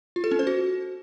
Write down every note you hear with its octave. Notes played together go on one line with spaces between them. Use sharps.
F4
A4
C#4
C5
F#4